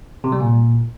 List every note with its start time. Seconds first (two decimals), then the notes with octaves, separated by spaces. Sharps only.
0.24 C3
0.32 G3
0.40 A#2